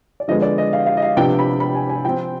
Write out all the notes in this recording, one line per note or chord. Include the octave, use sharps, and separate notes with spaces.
D5
D3 F3 G#3 B3 D#5
D5
D#5
F5
F5
D#5
F5
C3 F3 B3 D4 G5
B5
B5
G#5
G#5
F3 C4 G5